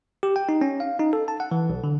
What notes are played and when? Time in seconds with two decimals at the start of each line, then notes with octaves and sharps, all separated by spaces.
0.23 G4
0.36 G5
0.49 D#4
0.61 C#4
0.80 F5
0.99 D#4
1.13 A4
1.28 A5
1.40 F#5
1.51 E3
1.70 B1
1.84 D3